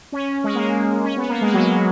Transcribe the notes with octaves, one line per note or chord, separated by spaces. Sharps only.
C#4
G#3
A#3
C#4
B3
A#3
G#3
F#3